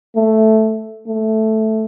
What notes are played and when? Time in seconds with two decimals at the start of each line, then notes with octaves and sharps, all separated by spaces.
0.16 A3
1.07 A3